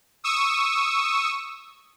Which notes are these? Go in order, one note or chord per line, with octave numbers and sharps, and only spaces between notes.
C#6 D#6 E6